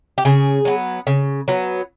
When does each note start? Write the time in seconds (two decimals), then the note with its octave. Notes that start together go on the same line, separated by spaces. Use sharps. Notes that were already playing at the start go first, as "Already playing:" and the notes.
0.18 G4
0.25 C#3 G#4
0.65 F#3 B3
1.07 C#3
1.48 F#3 B3